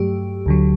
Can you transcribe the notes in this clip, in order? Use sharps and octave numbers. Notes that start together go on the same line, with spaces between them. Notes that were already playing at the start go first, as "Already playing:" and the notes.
Already playing: G2 F#3 A3 G4
D2 D3 F#3